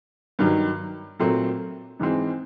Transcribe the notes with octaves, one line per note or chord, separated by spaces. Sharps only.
G2 D#3 F#3
A#2 F#3 A3 C4
G#2 E3 G#3 C4